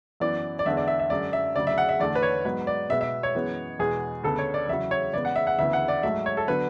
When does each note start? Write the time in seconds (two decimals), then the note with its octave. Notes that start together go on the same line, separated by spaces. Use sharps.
0.20 F#2 E3 B3 D5
0.59 D5
0.66 E2 D3 G#3 B3 E5
0.77 D5
0.88 E5
0.99 E5
1.10 F#2 D3 G#3 D5
1.33 E5
1.55 D2 C#3 F#3 D5
1.67 E5
1.78 F#5
1.89 E5
2.00 E2 D3 A3 D5
2.15 B4
2.23 C#5
2.44 G#2 F#3 B3 B4
2.67 D5
2.89 B2 G#3 B3 E5
3.01 E5
3.23 C#5
3.35 F#2 E3 G#3 B3
3.79 E2 B2 G#3 B3 G#4
4.23 D2 C#3 G#3 B3 A4
4.38 C#5
4.54 D5
4.69 E2 C#3 F#3 E5
4.91 C#5
5.14 E2 C#3 G#3 B3 D5
5.25 F#5
5.36 E5
5.47 F#5
5.58 D2 C#3 E3 B3 E5
5.73 F#5
5.88 D5
6.03 G#2 F#3 A3 E5
6.26 C#5
6.37 A4
6.48 D3 F#3 B3 B4